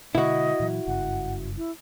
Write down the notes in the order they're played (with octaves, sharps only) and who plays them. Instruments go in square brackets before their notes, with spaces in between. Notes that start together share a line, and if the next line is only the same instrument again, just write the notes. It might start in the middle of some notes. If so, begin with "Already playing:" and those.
[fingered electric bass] B2 D3 G#3 [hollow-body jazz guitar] E4 F#4 [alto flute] D#5
[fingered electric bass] A#2 E3 F#3
[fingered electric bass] F#1 G2 C#3 [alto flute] F#5
[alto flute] E4